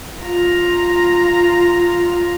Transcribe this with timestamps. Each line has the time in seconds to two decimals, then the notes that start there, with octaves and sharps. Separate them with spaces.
0.20 F4 A#5